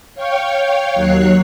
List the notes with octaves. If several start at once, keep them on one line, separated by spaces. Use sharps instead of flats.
C#5 F5 G5 C#6
D#2 F#3 C#5 F#6 C7